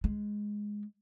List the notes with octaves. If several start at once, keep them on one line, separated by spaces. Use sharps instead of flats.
G#3